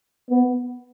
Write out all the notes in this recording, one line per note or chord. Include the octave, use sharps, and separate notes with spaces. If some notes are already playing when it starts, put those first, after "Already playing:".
B3